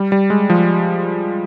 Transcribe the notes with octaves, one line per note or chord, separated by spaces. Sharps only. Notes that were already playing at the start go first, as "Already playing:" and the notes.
Already playing: G3
G3
G#3
F3